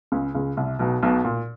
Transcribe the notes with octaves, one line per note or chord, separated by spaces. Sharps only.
C#2 C#3
C#2 C#3
C2 C3
B1 B2
B1 B2
A#2